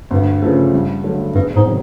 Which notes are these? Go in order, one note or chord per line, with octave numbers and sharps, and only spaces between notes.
D2 G2
C#3 F3 A3
G2
D3 F#3 A3
E2 G2
G#2
C3 D#3 F#3